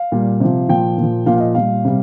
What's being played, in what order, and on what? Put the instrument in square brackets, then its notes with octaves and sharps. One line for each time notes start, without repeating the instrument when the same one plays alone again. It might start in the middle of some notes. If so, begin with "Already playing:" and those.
Already playing: [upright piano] F5
A#2 G3
C3 F3
A#2 F3 G5
A#2 F3
A#2 F3 F5
F5
D#5
A#2 G3 F5
C3 G3